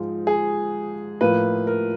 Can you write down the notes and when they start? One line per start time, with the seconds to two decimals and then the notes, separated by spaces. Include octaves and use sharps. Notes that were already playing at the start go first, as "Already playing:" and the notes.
Already playing: G#2 F3 G#3
0.27 G#4
1.21 A2 F3 A#3 B4
1.67 A#4